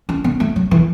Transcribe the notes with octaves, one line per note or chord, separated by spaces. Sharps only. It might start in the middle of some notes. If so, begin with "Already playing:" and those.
C#4
B3
A3
F#3
E3